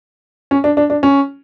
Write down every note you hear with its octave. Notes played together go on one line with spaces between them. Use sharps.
C#4
D4
D4
D4
C#4